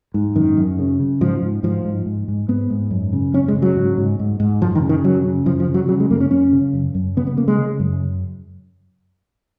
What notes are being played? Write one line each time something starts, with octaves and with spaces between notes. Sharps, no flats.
G#2
F#2 D#3
F#2
C#3
C#3
G#2 F3
G#2
G#2 F3
G#2
G#2
G#2
G#2 B3
G#2
F#2
C#3
F#2 C#4
G#3
C#3
F#3
G#2
G#2
G#2
G#2
F#2 F3
D#3
C#3
D#3
F#2 F#3
C#3
F#2 F3
F3
C#3
F#3
C#3 F#3
G#3
F#2 A#3
C#4
F#2 C#4
C#3
F#2
F#2
C#3 B3
B3
C#3 A#3
G#3
C#3
F#2